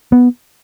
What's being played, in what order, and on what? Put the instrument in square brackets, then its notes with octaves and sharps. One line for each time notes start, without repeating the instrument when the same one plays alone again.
[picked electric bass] B3